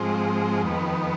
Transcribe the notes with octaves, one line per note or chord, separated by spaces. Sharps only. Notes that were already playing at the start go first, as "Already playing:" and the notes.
Already playing: G#2 F3 G#3 C4
F2 D#3 B3